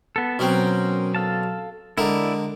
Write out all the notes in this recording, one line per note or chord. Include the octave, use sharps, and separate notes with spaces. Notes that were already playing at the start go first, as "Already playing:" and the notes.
B3 A4
B2 F#3 C4 C#4 A#4 C5
A4 F5 A5
D3 G#3 E4 A#4 D5